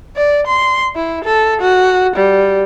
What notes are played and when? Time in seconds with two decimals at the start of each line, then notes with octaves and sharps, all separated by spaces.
0.16 D5
0.47 C6
0.96 E4
1.25 A4
1.62 F#4
2.16 G3